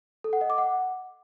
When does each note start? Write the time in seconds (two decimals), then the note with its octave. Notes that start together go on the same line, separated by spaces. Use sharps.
0.24 A4
0.33 F#5
0.41 D#5
0.50 D6
0.58 F#5